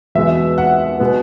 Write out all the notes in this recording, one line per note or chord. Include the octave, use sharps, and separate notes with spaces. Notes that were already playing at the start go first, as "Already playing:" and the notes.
E2 B2 G#3 B3 E5
F#5
B2 G#3 B3